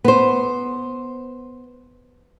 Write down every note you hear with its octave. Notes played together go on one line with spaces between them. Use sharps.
B3 C5